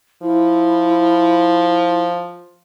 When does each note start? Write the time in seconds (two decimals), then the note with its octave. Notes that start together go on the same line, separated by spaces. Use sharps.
0.22 F3 E4